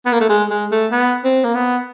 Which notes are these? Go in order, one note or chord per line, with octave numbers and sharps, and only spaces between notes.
B3
A#3
A3
G#3
G#3
A3
B3
C4
A#3
B3